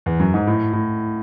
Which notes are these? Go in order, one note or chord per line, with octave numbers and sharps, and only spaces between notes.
E2
F#2
G#2
A2
A2